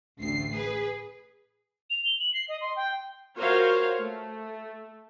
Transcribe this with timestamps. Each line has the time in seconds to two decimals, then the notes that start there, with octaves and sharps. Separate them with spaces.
0.21 A1 D2 C7
0.54 G#4 B4
1.90 F7
2.05 G7
2.19 F#7
2.34 C7
2.49 D#5
2.61 C6
2.76 G5
3.37 F4 F#4 A#4 C5 C#5 F5
3.98 A3